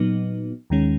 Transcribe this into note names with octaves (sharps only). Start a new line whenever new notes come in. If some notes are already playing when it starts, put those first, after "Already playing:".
Already playing: A#2 F#3 B3 D#4
D#2 D#3 G#3 C#4